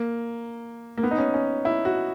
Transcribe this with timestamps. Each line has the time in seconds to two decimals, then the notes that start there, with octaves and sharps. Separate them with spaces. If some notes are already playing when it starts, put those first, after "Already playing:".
Already playing: A#3
0.97 A#3
1.03 B3
1.11 D#4
1.18 C#4
1.34 C#4
1.65 E4
1.85 F#4